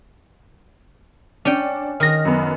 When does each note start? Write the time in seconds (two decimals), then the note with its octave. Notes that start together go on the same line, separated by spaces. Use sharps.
1.45 C#4 D4 G5
2.00 D#3 F6 A#6
2.25 F#2 B3